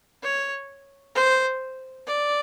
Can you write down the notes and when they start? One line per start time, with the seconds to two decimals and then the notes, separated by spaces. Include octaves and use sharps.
0.23 C#5
1.15 C5
2.07 D5